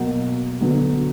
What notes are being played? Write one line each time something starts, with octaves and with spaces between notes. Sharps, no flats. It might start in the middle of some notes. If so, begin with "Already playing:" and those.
Already playing: B2 F#3 A#3 F#5
D3 F#3 B3